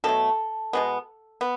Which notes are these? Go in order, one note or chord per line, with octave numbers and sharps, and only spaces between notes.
B2 F#3 A3 A4
B2 G#3 B3
B3